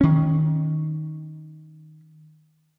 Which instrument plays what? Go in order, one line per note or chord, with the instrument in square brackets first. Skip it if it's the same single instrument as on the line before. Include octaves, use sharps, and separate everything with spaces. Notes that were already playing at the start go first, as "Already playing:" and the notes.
[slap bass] D#3 C#4